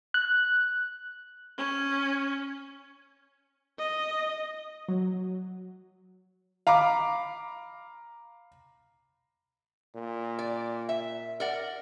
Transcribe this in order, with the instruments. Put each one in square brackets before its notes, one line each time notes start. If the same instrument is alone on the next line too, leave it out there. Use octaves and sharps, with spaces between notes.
[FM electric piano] F#6
[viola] C#4
[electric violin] D#5
[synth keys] F#3
[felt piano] F5 A#5 B5 D6
[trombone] A#2
[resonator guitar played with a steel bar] D5
E5
A#4 D5 F#5